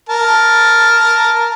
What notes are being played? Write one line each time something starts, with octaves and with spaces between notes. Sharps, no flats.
A#4 A5